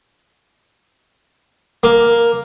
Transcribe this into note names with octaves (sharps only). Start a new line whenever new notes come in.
A#3